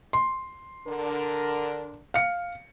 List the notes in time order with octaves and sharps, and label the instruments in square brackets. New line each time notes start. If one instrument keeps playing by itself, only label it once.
[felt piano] C6
[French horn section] D3 D4 A#4
[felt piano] F5 C#7